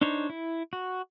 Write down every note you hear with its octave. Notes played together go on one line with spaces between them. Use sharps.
D4 D#4 C5 C#5
E4
F#4